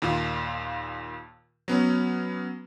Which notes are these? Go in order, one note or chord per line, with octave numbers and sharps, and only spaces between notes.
D#2 A#2 F4
F#3 B3 C#4